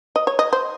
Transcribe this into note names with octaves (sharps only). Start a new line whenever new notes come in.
D#5
C#5
D#5
C5